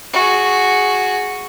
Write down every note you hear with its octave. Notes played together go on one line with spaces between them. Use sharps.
F#4 G#4